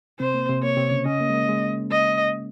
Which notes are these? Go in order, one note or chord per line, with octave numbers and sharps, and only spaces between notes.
C3 C4 C5
A#3
C3 C4
A#3 C#5
C3 C4
C#3 C#4
C#3 C#4 D#5
A#3
G#3
A#3
G#3
D#5